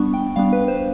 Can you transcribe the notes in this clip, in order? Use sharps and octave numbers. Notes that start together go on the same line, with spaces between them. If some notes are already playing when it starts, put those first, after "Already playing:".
Already playing: G3 B3 D4 C#6
G5
G3 B3 D4 F5
B4
C5